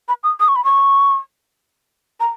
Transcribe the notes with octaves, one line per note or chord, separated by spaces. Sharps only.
B5
D#6
D#6
C#6
B5
C#6
A#5